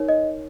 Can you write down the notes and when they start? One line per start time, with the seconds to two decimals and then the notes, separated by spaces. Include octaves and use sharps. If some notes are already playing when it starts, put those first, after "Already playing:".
Already playing: D#4 A#4 C#5
0.09 D#5